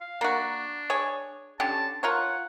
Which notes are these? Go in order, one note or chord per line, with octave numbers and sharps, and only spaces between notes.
F5
A#3 D4 F#4
G#4 C#5
D3 C#4 G4 A5
F4 A#4 C#5 F#5